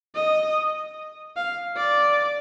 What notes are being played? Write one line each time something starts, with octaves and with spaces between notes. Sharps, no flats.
D#5
F5
D5